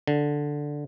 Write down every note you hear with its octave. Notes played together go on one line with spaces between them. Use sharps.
D3